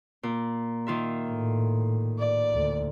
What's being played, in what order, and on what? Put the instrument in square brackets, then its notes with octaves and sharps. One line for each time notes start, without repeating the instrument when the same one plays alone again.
[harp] A#2
D#3 F4 E5
[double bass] A2
[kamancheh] D5
[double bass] D2